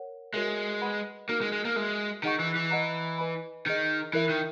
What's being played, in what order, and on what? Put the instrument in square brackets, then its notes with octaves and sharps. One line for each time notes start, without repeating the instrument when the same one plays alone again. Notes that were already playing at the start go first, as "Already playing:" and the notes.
Already playing: [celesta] A#4 C#5 F#5
[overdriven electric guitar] G#3 [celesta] F#4 A#4 C#5 E5
[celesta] B4 D#5 F#5 B5
[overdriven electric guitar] A#3 [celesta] D#4 F#4 A#4
[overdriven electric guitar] G#3
G#3
A#3
[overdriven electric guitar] G#3 [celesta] F#4 A#4 E5
[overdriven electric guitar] D#3 [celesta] G#4 D#5 F#5 A#5 C#6
[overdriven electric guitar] E3
E3
[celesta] B4 D#5 F#5 A#5
B4 D#5 G#5 B5
[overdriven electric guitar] D#3 [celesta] D#4 G#4 D#5
[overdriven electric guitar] E3 [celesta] E4 A#4 E5
[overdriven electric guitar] D#3